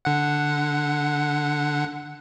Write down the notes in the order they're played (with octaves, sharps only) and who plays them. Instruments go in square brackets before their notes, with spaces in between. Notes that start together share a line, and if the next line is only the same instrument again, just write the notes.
[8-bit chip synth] D3 F#5